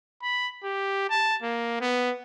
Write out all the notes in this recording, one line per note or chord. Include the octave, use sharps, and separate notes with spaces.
B5
G4
A5
A#3
B3